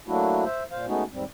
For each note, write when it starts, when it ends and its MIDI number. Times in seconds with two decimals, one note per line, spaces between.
0.08 0.44 54
0.08 0.44 57
0.08 0.44 58
0.08 0.44 62
0.08 0.44 64
0.08 0.44 66
0.45 0.63 72
0.45 0.63 76
0.71 0.86 46
0.71 0.86 72
0.71 0.86 77
0.87 1.04 56
0.87 1.04 57
0.87 1.04 59
0.87 1.04 61
0.87 1.04 63
0.87 1.04 66
1.13 1.24 39
1.13 1.24 44
1.13 1.24 55
1.13 1.24 60